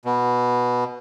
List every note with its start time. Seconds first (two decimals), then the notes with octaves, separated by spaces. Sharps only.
0.05 B2